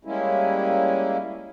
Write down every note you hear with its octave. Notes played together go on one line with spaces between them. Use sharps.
G3 G#3 A#3 C#4 E4